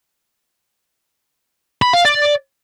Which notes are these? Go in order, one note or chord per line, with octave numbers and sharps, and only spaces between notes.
B5
F5
D5